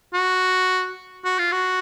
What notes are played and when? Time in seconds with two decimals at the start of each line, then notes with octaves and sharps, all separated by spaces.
0.14 F#4
1.25 F#4
1.39 F4
1.52 F#4